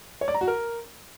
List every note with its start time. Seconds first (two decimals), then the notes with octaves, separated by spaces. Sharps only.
0.21 C#5
0.28 D5
0.34 A#5
0.41 F#4
0.48 A#4